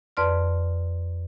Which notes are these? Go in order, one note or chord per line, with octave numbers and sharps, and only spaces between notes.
F2 B4 D5 C6 F6